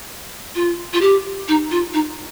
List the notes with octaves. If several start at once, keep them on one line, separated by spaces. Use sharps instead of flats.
F4
F4
G4
D#4
F4
D#4